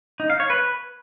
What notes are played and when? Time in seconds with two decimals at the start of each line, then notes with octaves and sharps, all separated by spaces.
0.20 D#4
0.30 F5
0.40 C#5
0.50 B4